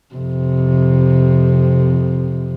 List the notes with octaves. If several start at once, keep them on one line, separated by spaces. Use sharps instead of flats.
F2 C3